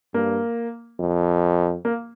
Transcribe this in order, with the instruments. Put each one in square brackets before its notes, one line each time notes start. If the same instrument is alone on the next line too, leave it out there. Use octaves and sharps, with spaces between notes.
[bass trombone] G2 [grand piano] A#3
[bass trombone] F2
[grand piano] A#3